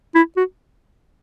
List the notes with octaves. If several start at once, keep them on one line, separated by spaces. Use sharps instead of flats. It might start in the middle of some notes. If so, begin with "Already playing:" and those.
E4
F#4